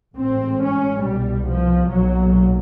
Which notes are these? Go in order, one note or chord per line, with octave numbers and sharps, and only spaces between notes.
A1 G#2 C4
C#4
C2 B2 G3
F3
B1 A#2 F#3